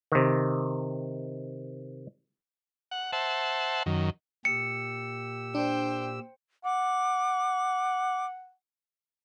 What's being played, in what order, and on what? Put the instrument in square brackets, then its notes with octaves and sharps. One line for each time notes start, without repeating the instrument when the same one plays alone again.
[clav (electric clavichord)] C3 D#3
[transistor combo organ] F#5
C5 E5 F#5 A5
F#2 D#3
[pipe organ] A#2 G4 E6 [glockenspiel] C#7
[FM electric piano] D4 [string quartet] C5 G5
[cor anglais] F#5 [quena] D6